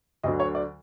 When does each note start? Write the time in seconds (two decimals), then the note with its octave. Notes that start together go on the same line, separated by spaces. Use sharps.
0.23 D2 D3 F#3 D#5
0.40 C#5
0.55 D5